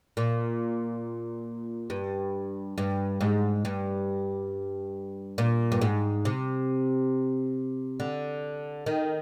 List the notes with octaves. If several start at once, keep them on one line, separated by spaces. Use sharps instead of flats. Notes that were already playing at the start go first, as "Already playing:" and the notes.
A#2
G2
G2
G#2
G2
A#2
G2
G#2
C3
D3
D#3